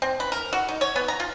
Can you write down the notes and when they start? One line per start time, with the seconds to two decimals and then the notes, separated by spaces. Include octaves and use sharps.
0.02 C4
0.20 B4
0.32 A#4
0.53 F#4
0.69 D#4
0.81 C#5
0.96 B3
1.08 A#5
1.20 F4